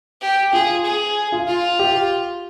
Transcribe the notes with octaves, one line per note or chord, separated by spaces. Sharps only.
G4
F4 G#4
G#4
F4
F4
G4